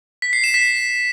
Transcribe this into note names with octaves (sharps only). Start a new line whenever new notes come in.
B6
C7
E7
B6